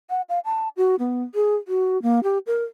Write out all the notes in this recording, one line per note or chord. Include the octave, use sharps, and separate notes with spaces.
F#5
F5
A5
F#4
B3
G#4
F#4
A#3
G4
A#4